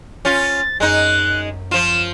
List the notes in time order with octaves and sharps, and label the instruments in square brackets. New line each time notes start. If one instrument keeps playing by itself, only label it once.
[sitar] C#4 F4 [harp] C5 [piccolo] A6
[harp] F#2 [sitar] G#3 D#4 [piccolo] F#6
[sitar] F3 F4 [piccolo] E7